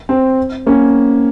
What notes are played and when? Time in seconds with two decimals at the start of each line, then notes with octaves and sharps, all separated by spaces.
0.09 C4
0.67 A#3 C#4